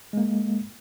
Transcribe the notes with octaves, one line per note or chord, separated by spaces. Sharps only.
G#3 A#3